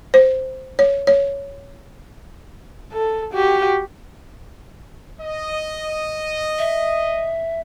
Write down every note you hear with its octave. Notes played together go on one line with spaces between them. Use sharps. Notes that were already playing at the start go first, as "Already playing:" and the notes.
C5
C#5
C#5
A4
F#4 G4
D#5
E5